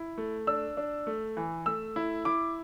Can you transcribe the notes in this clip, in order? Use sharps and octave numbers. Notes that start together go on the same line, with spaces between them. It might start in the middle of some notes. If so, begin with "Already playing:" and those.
Already playing: E4
A3
D4 E6
D4
A3
E3
A3 E6
E4
E4 D6